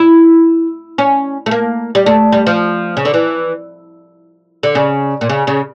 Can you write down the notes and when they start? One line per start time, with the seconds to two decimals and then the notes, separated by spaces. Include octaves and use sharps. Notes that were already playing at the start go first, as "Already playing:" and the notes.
Already playing: E4
0.98 C#4
1.46 A3
1.51 A#3
1.95 G3
2.06 A3
2.32 G3
2.47 F3
2.97 C#3
3.05 D3
3.14 E3
4.63 D3
4.75 C#3
5.21 A#2
5.30 C#3
5.47 C#3